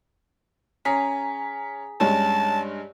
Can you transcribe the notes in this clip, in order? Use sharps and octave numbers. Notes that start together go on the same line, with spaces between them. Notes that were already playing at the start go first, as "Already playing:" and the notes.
C#4 G#4 A#5 B6
G2 G#3 C#4 C#5 A5